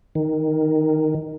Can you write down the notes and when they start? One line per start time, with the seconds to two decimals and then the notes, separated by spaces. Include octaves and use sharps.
0.15 D#3